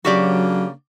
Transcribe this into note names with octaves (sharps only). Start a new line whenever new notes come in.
C#3 F#3 A#3 D4 F#4 G4 D5